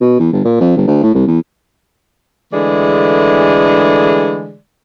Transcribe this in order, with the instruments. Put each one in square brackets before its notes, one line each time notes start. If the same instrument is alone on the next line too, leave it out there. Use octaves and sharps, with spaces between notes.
[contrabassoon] B2
E2
G1
A#2
F2
G1
D2
A2
C2
E2
[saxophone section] D3 E3 G#3 A3 G#4 D5